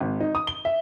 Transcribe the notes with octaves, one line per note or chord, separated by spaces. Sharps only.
G#1
D#4
D#6
G7
E5